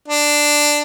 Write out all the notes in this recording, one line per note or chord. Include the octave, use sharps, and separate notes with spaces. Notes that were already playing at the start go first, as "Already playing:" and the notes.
D4